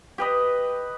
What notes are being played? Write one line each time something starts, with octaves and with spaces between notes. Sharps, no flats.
G4 B4 D#5